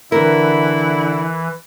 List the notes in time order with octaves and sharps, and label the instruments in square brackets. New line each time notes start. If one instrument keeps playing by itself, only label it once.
[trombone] D3 [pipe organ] E3 [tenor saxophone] E4 [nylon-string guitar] A#4